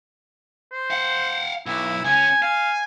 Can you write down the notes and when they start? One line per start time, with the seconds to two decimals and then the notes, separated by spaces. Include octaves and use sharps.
0.72 C5
0.91 F5 F#5
1.66 B1 E4
2.04 C#2 C#4 G#5
2.42 F5 G#5